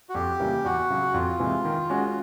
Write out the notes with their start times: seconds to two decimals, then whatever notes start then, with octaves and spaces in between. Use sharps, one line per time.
0.10 F#4
0.15 F2 G4
0.40 C#3 E3 G3 A#3
0.65 E2 F#4
0.90 C#3 F#3
1.14 F2 F4
1.39 C3 E3 G#3
1.65 D#3
1.90 G#3 C#4 F#4